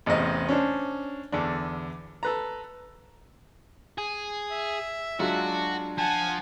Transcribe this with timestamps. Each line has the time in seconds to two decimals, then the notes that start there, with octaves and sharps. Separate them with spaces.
0.06 A1 E2 C3 C4 D#5
0.49 C#4 D4 C5
1.32 E2 D3 D4
2.23 A4 B4 A#5
3.98 G#4
4.51 E5
5.20 F#3 G#3 D4 F4 F#4
5.98 F3 F#5 G#5 A5